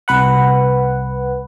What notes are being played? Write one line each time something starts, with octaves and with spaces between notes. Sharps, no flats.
C2 B4 F#5